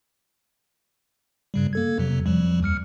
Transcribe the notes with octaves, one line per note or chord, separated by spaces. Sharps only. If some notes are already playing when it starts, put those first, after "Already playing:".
G2 C#3 G3
A#3 A4 G#6
F2 C3 F#3
F2 F3 G3
D#2 F6 C#7